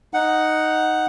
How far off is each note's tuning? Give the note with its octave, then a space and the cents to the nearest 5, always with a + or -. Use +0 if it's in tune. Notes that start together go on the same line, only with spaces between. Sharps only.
D#4 +0 F#5 +0